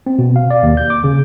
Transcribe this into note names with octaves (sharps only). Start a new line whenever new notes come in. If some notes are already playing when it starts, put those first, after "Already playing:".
C4
B2
F5
D5
D#2
G6
D6
C#3